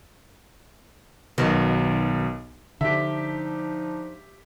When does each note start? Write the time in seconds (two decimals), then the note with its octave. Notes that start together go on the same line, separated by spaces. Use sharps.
1.38 B1 B2 D#3
2.81 D3 F3 D4 D#4 G4 E5